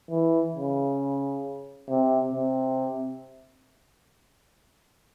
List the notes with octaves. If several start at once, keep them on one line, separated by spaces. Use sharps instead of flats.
E3
C#3
C3
C3